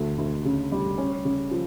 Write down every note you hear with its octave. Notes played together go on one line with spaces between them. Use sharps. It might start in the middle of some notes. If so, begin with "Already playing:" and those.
Already playing: D2 A3
D2
C#3
G3
C#4
C#3
F3